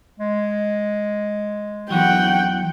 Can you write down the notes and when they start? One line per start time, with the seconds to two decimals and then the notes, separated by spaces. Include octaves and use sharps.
0.20 G#3
1.90 E2 E3 F#3 F#5 G5